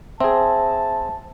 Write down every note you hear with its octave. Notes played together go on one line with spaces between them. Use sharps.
C4 G#4 E5 A5